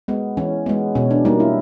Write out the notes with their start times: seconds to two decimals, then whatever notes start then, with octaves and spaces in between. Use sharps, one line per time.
0.08 G#3 B3
0.37 E3 C#4
0.66 G#3 B3
0.95 B2 C#4
1.11 D4
1.25 G3 A#3 D#4
1.40 E4